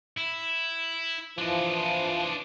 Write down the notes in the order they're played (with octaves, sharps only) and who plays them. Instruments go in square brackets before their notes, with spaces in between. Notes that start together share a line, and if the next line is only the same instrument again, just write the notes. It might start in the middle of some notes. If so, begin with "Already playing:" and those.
[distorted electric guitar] E4
[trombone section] E3 F3 [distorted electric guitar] D4 D#5